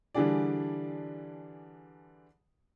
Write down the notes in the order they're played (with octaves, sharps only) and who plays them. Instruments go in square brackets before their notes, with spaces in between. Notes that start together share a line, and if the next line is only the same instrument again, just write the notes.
[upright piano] D3 E3 G3 D4 G#4 D5